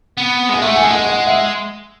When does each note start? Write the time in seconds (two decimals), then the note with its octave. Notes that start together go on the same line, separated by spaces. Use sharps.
0.18 B3
0.49 G#3 F#5
0.62 A3 E5
0.76 G#5
0.84 G#3
0.91 F#5
1.05 F#5
1.27 E5